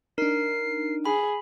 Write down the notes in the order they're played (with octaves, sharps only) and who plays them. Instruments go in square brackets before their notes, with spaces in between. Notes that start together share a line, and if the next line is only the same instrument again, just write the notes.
[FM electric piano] D4 D#4 [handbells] A#4 [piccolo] C7
[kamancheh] G#4 [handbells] B5